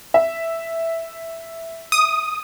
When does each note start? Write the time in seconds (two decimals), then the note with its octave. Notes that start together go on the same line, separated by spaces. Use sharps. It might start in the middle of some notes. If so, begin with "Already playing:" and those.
0.14 E5
1.92 D#6